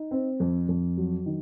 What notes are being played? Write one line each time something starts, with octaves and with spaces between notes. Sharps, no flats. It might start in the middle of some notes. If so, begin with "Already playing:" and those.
Already playing: D#4
C4
F2
F2
F#3
D#3